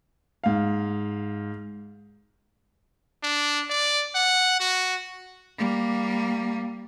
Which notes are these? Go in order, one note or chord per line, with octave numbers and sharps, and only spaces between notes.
G#2 F5
D4
D5
F#5
F#4
G3 A#3